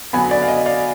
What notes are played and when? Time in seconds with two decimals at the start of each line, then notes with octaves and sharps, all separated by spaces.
0.13 D3 F#3 B3 G#5 B5
0.31 D5
0.42 F5
0.48 D#5
0.66 D5 F5